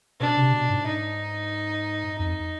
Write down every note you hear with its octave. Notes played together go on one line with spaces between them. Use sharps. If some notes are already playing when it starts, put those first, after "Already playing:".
B2 D4
C3
B2
G#2
D#4
F2 D#4